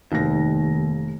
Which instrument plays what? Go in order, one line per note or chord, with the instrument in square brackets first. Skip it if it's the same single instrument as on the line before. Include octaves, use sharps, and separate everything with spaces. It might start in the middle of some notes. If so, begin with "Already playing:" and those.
[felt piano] F1 D#3 A#6 [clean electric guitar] D#2